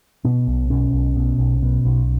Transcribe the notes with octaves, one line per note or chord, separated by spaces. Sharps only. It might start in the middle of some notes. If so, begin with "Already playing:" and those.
B2 B3
B1
B2 C#4
B1
B2
B1
B2
B1